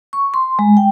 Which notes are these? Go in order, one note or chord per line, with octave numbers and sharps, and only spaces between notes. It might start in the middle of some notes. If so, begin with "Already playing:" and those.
C#6
C6
G#3
G5